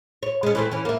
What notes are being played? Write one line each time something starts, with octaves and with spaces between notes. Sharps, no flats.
C#5
G#3 C#4
E3 A3 C4
E3 C#4
A#3 E5